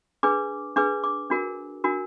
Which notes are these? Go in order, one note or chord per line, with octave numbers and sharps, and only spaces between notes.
D4 G#4 B4 D6
D4 G#4 B4 D6
D6
D4 F#4 A#4
D4 F#4 A#4